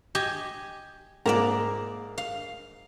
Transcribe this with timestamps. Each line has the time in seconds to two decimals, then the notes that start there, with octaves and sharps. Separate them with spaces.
0.15 G4 D#5 G#5
1.26 G#2 A#3 D5 E5 A#5
2.18 F5